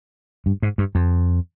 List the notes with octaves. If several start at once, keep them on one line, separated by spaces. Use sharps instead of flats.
G2
G#2
G2
F2